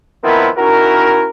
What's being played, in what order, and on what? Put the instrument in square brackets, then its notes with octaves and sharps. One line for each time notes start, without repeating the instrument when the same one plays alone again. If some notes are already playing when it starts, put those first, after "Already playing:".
[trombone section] D#3 F3 B3 C4 E4 A#4
C#4 D#4 E4 F#4 A#4